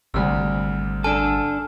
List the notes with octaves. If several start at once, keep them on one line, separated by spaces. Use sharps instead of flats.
G#1 D2 C3 G3 E6 F6
D4 A4 G#5 F6 D7